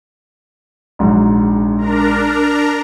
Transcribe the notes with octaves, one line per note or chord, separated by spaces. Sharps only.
A#1 G#2 F#3
D4 A#4 A#5